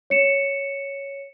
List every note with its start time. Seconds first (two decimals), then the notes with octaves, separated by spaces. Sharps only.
0.10 C#5 C#7 E7